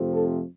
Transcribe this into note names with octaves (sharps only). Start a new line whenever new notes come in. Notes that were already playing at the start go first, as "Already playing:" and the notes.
Already playing: F2 C3 F3 A3
A4